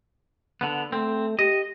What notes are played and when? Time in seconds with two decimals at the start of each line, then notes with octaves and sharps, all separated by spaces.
0.61 D3 B3
0.92 A3 C4
1.39 G4 D#5